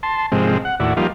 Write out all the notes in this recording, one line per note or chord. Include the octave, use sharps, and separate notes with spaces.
A5 C6
G#2 C3 F3 G#3 C4
F#5
D#2 A2 E4 F#4 D5
F3 G3 A#3 D#4 F4